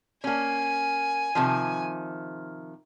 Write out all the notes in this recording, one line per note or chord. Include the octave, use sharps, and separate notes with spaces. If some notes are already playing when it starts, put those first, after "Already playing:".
A#3 C#4 G#5
C3 D#3 F3